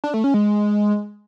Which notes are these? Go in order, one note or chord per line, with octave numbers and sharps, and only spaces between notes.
D4
A3
C#4
G#3